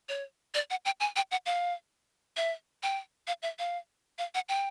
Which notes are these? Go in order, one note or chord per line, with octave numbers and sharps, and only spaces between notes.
C#5
D5
F#5
G5
G#5
G5
F#5
F5
E5
G5
F5
E5
F5
F5
F#5
G5